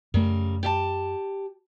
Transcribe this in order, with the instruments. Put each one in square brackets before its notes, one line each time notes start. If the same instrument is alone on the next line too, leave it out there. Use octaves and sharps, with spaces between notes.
[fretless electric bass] F#2 A3 [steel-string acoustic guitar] C#3 G3 A#4
[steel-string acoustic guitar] G4 E5 A5